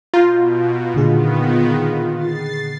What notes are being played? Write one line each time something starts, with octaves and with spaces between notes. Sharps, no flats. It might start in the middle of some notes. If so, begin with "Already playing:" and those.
B2 F4 A#5 G6
A#2 D3 D#3 B3 G#4
A6 C7